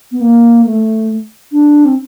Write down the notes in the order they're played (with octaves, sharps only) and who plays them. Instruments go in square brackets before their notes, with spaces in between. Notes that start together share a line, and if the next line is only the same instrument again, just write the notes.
[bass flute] B3
A#3
A3
D4
C4